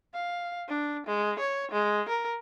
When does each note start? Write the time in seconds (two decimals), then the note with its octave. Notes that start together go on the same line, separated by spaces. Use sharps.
0.14 F5
0.68 D4
1.06 G#3
1.39 C#5
1.71 G#3
2.09 A#4